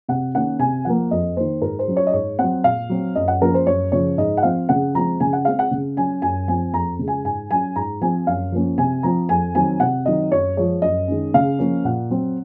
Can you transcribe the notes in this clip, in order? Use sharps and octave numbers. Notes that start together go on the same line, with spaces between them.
C3 F#5
D#3 A#3 C#4 F#5
C3 G#5
F3 A#3 F#5
F2 D#5
D#3 A#3 C5
G#2 A#4
C5
F#3 C#4
C#5
D#5
G#2 C#5
F#3 C4 F#5
A#2 F5
F#3 C4
F#2 D#5
F#5
F3 A#3 C#4 A#4
C5
F#2 C#5
C#3 F3 C#5
G#2 D#5
F#5
F3 C4 F5
C#3 F#5
F3 G#3 C4 A#5
C#3 G#5
F#5
G#3 C4 F5
F#5
C#3
F#3 C#4 G#5
F#2 G#5
F3 C4 G#5
F2 A#5
C#3 G#3
G#5
G#2 G#5
F#3 C#4 G#5
G#2 A#5
F3 C4 G#5
F#2 F5
F3 A#3 C#4
C3 G#5
F3 C4 A#5
F2 G#5
D#3 F#3 C4 G#5
C3 F#5
D#3 F#3 C4 D#5
F#2 C#5
F3 G#3 C#5
F#2 D#5
D#3 G#3 C#4
C#3 F5
F3 A#3 C#4
A#2 F#5
F#3 C4